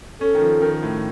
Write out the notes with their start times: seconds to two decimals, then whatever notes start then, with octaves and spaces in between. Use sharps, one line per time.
0.21 C#4 A4
0.35 D#3
0.41 F3
0.62 D#3
0.83 A2